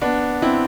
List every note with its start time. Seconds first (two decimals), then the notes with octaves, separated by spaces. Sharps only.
0.02 B3 D4
0.42 C4 E4